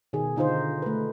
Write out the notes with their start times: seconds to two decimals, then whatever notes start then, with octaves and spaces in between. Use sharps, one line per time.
0.13 B2 D#3 G#4
0.36 D3 D#4 F4 C5
0.82 A3 B4